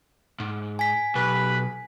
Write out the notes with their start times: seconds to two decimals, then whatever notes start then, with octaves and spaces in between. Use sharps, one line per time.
0.40 G#2
0.79 G#5 B6
1.15 B1 G4 B4